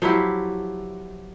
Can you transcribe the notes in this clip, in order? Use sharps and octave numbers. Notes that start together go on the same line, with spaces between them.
F3 F#3 E4 G4